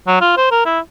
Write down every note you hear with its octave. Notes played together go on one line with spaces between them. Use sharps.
F#3
F4
C5
A#4
E4